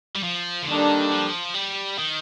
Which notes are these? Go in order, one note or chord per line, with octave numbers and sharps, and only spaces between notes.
G3
F3
D3
D#3 G3 A#3 D4 A4
F3
G3
D#3